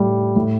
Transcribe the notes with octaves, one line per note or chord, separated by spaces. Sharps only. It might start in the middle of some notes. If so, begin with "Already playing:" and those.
Already playing: A2 G3
A2